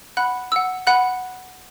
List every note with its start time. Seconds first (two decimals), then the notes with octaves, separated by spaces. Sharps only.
0.17 F#5 B5 F#6
0.52 F#5 E6
0.87 F#5 B5 F#6